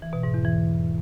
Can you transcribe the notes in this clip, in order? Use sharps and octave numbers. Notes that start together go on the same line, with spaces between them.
E3
B2
G#2
E2
E3